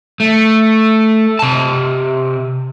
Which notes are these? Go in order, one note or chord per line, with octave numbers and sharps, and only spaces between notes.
A3
C3 A5